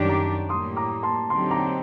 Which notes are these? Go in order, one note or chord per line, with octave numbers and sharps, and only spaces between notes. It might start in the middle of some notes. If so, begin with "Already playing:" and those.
Already playing: F#2 D#3 G3 D4 G4
A#5 D6
A2 G3 A#3 C6 D#6
A#5 D6
A5 C6
D3 F#3 C4 D#4 G4 A5 C6
A#5 D6